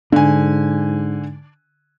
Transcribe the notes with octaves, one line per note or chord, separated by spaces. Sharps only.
G#2 D3 D4 G#5